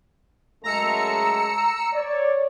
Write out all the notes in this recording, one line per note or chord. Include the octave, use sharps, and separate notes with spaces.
F#2 G#3 A3 A#5 E6 C#7
C#5 D5